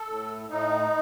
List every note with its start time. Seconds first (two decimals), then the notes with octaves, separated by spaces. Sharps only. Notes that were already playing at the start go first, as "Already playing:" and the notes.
Already playing: A4
0.08 A2
0.49 A2 D#4